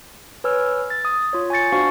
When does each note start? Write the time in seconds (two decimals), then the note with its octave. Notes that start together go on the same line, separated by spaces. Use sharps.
0.44 B4 C#5 G#5 E6 F6
0.90 A6
1.05 D#6
1.33 F4 C#5
1.50 G#5 C#6 G6 A6 C#7
1.72 D4 F#4 C5 F5 C#6